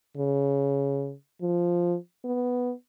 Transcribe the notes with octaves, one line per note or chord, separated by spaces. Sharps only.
C#3
F3
B3